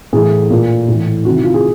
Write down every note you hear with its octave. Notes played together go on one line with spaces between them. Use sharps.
A2 E3 G#4
A#2
A2 E3
C3 D#3 F#4
E4
F4
G#4